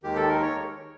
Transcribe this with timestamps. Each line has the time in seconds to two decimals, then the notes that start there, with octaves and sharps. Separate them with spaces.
0.03 D#2 D#3 G#3 G4
0.16 A4
0.29 A#4
0.42 C#5